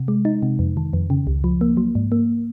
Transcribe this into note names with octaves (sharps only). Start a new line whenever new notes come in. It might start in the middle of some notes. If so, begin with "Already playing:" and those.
Already playing: C3
G#3
D#4
C3
F2
D#3
F2
C#3
C#2
F3
A#3
F#3
G#2
A#3